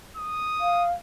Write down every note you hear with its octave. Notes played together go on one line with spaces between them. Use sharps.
D#6
F5